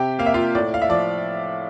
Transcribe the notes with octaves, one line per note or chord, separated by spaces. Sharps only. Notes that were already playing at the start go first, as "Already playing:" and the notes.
Already playing: C3 G4 G5
A#3 F5
E5
F4 F5
A2 D5
F5
E5
F3 D5